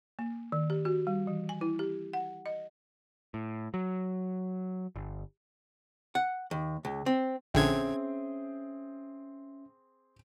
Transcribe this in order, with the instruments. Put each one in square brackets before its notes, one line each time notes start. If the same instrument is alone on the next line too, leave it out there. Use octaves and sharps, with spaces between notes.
[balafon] A#3
D#3
G4
F#4
G3
E3
G#5
E4
G4
F#5
D#5
[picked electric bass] A2
F#3
G1
[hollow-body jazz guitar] F#5
D#2
C#2
C4
[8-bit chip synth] A#1 D3 G#6 [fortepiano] C4 G#4 G5 [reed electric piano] C#4 E5